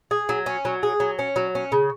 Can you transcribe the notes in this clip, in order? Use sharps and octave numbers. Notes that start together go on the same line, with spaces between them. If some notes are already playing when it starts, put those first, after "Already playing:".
G#4
F#3
C#4
F#3
G#4
F#3
C#4
F#3
C#4
C#3